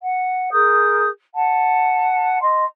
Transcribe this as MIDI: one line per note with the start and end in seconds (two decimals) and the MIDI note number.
0.01 0.48 78
0.51 1.07 68
0.51 1.07 70
0.51 1.07 87
0.51 1.07 91
1.34 2.38 78
1.34 2.38 81
2.40 2.64 75
2.40 2.64 84